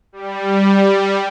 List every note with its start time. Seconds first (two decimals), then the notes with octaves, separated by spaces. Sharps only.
0.13 G3